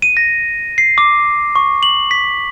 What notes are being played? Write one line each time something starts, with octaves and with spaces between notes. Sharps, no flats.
D#7
A#6
C7
D6
C#6
F#7
B6